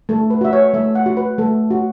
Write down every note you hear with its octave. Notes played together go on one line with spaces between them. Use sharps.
A3 A4
B4
F#4 E5
C#5
A3 E5
F#5
F#4
B4
A3 A4
F#4